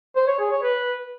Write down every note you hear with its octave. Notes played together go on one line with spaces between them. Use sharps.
C5
C#5
G#4
C#5
B4